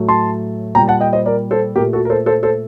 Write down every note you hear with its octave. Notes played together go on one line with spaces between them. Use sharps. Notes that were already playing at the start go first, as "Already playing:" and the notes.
Already playing: A2 F#3 A3
A5 C6
A#2 G3 G5 A#5
F#5 A5
D#5 G5
C5 D#5
A#4 D5
A4 C5
A#2 A3 G4 A#4
F#4 A4
A#4
A4 C5
A4 C5
A4 C5